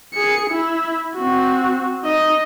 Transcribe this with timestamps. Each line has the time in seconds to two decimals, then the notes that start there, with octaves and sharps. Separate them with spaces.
0.14 G#4 C#7
0.50 E4
1.16 C4 F#4
2.03 D#4 D#5